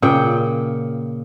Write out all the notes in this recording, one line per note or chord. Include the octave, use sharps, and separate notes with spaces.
A#2 C#3 F#5 G5